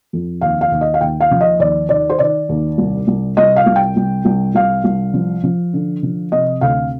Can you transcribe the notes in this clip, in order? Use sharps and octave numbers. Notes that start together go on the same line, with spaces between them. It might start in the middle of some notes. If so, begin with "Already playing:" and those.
F2
D#2 F5
F5
D#2
D#5
F5
D#2 G5
F5
F3
D#5
D#2 D5
D#3 D5
C5
D#3 D5
D#2
C2
C2
C2 D#5
F5
C2
G5
C2
C2
C2 F5
C2
F3
F3
D3
F3
C3 D#5
D2 F5